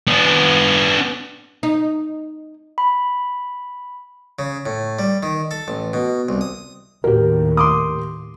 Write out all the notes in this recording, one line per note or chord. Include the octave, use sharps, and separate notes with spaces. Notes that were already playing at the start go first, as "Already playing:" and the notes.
B3 D4
D#4
B5
C#3
A2
G3
D#3
A4
A1
B2
C2
D#6
D#2 A2 G4 A#4
C6 D6 D#6